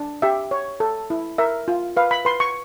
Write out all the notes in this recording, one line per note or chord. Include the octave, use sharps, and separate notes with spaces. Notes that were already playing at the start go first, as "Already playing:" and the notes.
Already playing: D4
G4 E5
C#5
A4
E4
A#4 E5
F4
B4 F5
B5
B4 C6
C#6